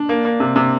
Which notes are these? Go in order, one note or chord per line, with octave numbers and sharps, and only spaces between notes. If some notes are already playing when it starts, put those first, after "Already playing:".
Already playing: D4
A#3
A#3
C3
C3